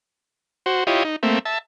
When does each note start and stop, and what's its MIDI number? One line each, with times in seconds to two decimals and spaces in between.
0.66 0.84 66
0.66 0.84 72
0.87 1.03 64
0.87 1.03 65
0.87 1.03 67
0.87 1.03 73
0.87 1.03 75
1.05 1.16 63
1.23 1.39 57
1.23 1.39 58
1.23 1.39 60
1.23 1.39 76
1.45 1.58 76
1.45 1.58 81